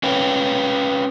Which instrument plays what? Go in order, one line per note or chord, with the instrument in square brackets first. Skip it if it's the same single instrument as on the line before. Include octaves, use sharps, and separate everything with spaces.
[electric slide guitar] C#4 B4 C#5 F5 G5